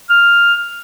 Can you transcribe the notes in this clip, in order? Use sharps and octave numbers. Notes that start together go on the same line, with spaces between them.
F6